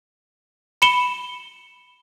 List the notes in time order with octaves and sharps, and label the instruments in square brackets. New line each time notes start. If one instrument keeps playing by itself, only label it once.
[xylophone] B5 C#7 E7 G7